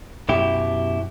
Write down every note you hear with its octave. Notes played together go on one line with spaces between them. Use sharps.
F#2 B2 E4 G4